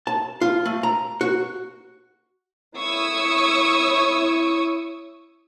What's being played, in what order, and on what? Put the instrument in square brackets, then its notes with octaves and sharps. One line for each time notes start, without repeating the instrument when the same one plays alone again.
[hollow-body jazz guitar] A5
F4
A3
A#5
F#4
[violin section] E4 C#5 C#6 D#6 E6